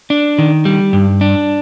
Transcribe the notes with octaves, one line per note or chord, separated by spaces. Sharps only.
D4
D#3
G3
G2
D4